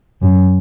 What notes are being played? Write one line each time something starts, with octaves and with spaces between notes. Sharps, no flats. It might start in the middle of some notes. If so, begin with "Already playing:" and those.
F#2